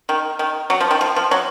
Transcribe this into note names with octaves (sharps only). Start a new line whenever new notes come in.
D#3
D#3
F#3
F3
D#3
F3
F3
F#3